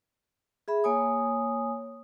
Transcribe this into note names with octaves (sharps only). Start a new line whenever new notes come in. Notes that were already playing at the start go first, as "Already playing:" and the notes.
G#4 E5 B5
A#3 C#5 G#5 D#6